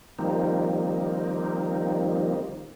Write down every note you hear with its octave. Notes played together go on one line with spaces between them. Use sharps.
D#3 F3 G3 A#3 C4 D#4